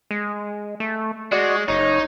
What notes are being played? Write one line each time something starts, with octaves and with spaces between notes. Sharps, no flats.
G#3
A3
G#3 F#4 D5
F#1 D#4 C#5